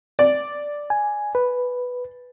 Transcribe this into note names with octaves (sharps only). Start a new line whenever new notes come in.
D5
G#5
B4